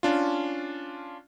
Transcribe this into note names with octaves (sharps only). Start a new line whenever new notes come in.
C#4 D4 F4